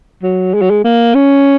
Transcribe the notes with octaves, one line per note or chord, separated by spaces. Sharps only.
F#3
G#3
F#3
G#3
A#3
C#4